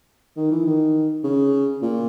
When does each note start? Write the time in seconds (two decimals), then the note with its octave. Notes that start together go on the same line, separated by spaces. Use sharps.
0.37 D#3
0.51 E3
0.65 D#3
1.24 C#3
1.82 A#2